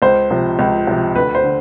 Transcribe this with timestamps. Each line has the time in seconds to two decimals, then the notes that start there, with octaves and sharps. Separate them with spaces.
0.02 C#2 C5
0.31 C3 F3
0.59 C#2
0.87 C3 F3
1.15 D2 B4
1.35 C5
1.44 D3